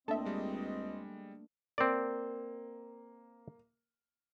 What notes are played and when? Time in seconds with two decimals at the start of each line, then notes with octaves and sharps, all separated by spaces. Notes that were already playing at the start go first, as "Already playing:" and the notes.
0.08 C#2 A3 A#3 C4 D4 A4 D#5 E5
0.25 G3 G#3
1.78 A#3 C4 D5